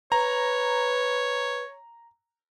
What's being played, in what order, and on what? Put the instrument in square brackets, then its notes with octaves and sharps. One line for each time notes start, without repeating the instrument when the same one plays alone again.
[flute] B4 [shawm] C#5 [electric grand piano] A#5